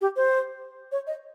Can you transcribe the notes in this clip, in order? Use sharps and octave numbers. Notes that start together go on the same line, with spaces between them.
G4
C5
C#5
D#5